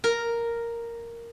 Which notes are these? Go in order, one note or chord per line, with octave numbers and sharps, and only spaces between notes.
A#4